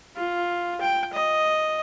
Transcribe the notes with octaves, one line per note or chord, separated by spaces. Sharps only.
F4
G5
D#5